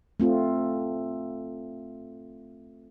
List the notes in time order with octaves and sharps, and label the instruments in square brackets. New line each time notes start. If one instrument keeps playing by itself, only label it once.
[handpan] A3 C4 F4